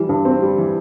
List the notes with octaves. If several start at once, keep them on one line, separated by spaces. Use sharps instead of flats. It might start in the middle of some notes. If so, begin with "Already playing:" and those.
Already playing: E3 G3
G2
C4
G3
E3